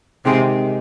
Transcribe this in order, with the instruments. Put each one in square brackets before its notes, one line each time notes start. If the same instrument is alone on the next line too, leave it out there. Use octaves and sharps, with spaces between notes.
[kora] G#2 D#3 G#3 [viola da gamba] C3